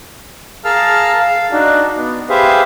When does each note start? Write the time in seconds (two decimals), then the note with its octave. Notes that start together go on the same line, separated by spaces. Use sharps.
0.65 G#4 A#4 F5 A5 E6 F6
1.19 F5
1.52 D4 D#4 F#4
1.97 B3
2.29 G4 G#4 B4 C5 E5 F5